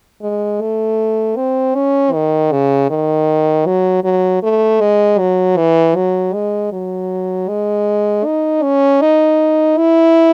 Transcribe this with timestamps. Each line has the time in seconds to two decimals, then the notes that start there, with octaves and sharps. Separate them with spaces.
0.22 G#3
0.61 A3
1.36 C4
1.75 C#4
2.13 D#3
2.52 C#3
2.90 D#3
3.66 F#3
4.04 F#3
4.43 A3
4.81 G#3
5.19 F#3
5.57 E3
5.96 F#3
6.33 G#3
6.72 F#3
7.48 G#3
8.25 D#4
8.63 C#4
9.01 D#4
9.77 E4